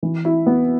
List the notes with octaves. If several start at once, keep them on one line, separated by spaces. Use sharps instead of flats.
E3
E4
B3